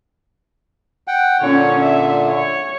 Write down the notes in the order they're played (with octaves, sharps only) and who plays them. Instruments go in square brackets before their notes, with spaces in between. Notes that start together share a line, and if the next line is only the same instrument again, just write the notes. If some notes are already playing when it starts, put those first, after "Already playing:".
[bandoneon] F#5 G5
[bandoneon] A#2 D3 [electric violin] C#4 C#5
[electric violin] E5
C#5